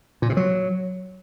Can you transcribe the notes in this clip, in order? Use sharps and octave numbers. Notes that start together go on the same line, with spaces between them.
A#2
C3
F#3